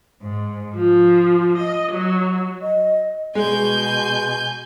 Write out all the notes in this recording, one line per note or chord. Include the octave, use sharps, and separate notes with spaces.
G#2
F3
D#5
F#3
D#5
B2 G#3 G#5 G6